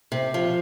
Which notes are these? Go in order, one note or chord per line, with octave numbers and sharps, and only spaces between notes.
C3
F3